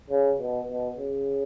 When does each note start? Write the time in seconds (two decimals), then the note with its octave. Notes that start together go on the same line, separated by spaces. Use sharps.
0.10 C#3
0.39 B2
0.68 B2
0.97 C#3